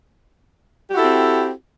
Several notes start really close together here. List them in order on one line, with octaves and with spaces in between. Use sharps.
G4 F#4 E4 A4 C4